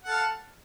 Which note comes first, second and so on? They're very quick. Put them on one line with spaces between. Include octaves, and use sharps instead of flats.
F#5 A4 F5